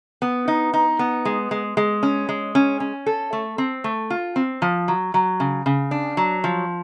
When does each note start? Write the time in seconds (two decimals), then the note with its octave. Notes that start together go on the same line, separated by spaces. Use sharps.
0.22 B3
0.48 D#4
0.73 D#4
0.99 B3
1.25 G#3
1.51 G#3
1.77 G#3
2.03 C#4
2.29 G#3
2.55 C#4
2.80 C#4
3.06 A4
3.33 A3
3.58 C4
3.84 A3
4.10 F4
4.36 C4
4.62 F3
4.88 F#3
5.14 F#3
5.40 C#3
5.66 C#3
5.91 D4
6.17 F#3
6.44 F3